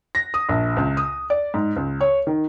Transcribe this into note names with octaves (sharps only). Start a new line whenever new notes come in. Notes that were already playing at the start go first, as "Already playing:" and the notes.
A#6
D#6
A#1
C#2
D#6
D5
G#2
C#2
C#5
D#3